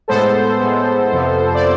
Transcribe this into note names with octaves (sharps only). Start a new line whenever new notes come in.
A2 G#3 B3 A4 C5
A2 G#3 B3
F2 C3 F3 B3
D5